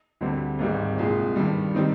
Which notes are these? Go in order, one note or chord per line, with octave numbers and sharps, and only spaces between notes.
D2 D3 G3 C4
G#1 G#2 G3 C4
C2 A#2 G#3
G2 D#3 G3
D#3 G3 C4 D#4